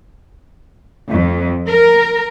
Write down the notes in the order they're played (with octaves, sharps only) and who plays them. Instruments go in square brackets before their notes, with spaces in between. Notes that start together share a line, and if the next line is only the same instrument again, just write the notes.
[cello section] F2
A#4